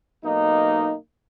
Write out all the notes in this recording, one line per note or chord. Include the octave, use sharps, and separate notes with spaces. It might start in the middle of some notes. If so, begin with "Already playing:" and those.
B1 A#3 D#4